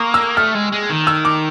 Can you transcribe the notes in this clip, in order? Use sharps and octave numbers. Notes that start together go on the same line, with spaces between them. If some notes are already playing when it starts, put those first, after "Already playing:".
Already playing: A#3 C#6 D#6
E6
A3 F6
G#3
G#3
D#3
E6
D6